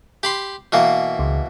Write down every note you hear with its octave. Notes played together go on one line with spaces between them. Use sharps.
G4 B5 C6
B2 E3 A#3
C#2